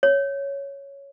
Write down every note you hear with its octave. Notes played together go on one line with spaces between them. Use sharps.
C#5